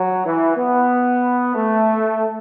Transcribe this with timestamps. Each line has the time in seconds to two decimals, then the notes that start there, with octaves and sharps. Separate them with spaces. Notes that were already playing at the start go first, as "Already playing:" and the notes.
Already playing: F#3
0.25 E3
0.57 B3
1.55 A3